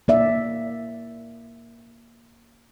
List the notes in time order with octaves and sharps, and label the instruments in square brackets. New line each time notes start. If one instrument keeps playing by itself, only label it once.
[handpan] A#3 D5 E5